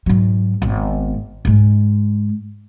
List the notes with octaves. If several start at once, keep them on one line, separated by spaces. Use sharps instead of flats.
G#2 F#3
G#1 B3
G#2 G#3